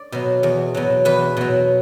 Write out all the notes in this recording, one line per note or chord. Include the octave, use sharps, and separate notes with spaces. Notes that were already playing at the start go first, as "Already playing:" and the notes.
Already playing: D5
B2 F#3
E2
B2 F#3
E2 B4
B2 F#3